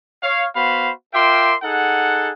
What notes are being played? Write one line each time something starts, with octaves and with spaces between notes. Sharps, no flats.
C#5 F5
B3 F#4 C5 F5 B5
F4 A#4 E5 G5 C6 D6
D#4 G#4 A4 F#5